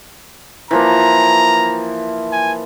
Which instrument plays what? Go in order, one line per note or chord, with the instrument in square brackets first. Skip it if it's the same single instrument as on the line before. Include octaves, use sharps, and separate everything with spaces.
[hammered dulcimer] E3 F3 A#3 [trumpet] A#5
[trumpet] G#5